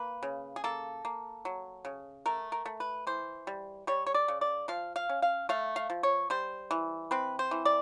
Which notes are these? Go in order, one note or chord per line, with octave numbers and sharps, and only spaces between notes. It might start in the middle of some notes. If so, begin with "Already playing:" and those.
Already playing: A#3 B4
C#3
G#4
A#3 A4
A#3
F#3
C#3
A3 A#4
A#4
A3
B4
E3 C5
G3
G3 C#5
C#5
D5
C#3
D5
F3 F5
F5
C#4
F5
A3 F5
F5
F3
C#5
G3 C5
E3
C4 B4
C5
E3
D5